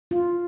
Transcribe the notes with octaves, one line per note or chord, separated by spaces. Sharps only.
F4